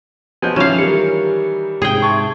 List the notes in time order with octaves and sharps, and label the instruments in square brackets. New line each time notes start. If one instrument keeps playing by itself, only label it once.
[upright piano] F3 [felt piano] F#3 B3 G6 [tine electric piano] D#5 G#5
[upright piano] D#3 E3 F#3 [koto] C#4 F5 [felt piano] F4 E7
[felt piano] G3 A#4 [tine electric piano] C#7
[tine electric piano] G#2 C3 [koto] G#4 G5
[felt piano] E5 A5 C6 [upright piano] C#6 G#6